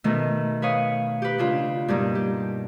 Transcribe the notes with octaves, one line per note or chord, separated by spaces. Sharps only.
B2 D#3 A3
B4 C#5 F5 D#6
G4 B4
C#3 D4 F4
G2 B2 G3 A#3 D4 D#4
G4